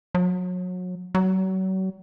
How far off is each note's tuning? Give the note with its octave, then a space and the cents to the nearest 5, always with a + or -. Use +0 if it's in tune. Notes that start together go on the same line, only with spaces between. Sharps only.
F#3 -30
F#3 +35